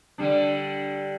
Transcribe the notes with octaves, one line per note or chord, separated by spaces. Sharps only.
D3 G3 D4